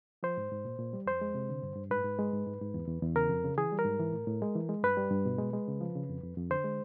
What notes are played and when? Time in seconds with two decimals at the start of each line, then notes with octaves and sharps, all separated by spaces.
0.23 F3 C5
0.37 G#2
0.52 G#2
0.65 A#2
0.79 A#2
0.93 G3
1.06 F2 C5
1.21 G#3
1.34 C3
1.49 D3
1.62 G2
1.76 G2
1.91 G#2 B4
2.04 G#2
2.19 G#3
2.33 G#2
2.46 G#2
2.61 G#2
2.74 E2
2.88 E2
3.02 E2
3.15 C#3 A#4
3.29 F2
3.44 C#3
3.58 E3 G#4
3.72 G3
3.79 A#4
3.85 G#2
4.00 E3
4.13 A2
4.27 A2
4.42 G#3
4.56 E3
4.69 G#3
4.83 G2 B4
4.97 G3
5.11 G2
5.25 B2
5.38 G#3
5.53 G#3
5.68 C#3
5.81 F3
5.95 C#3
6.09 F2
6.23 F2
6.37 F2
6.50 D3 C5
6.64 G#3